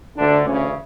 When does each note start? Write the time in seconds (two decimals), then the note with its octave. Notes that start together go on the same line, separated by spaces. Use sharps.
0.16 D2 D3 D4
0.44 D2 C#3 E3 C#4